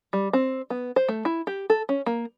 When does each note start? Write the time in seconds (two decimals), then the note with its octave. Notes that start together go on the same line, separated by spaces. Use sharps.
0.13 G3
0.33 C4
0.70 B3
0.96 C5
1.09 A3
1.25 E4
1.47 G4
1.70 A4
1.89 C#4
2.06 A#3